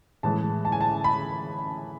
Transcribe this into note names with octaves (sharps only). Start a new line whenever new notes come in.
A2 E3 G#3 A5
A5
G#5
A5
B5